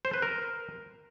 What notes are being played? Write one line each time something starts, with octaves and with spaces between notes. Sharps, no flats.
C5
B4
A#4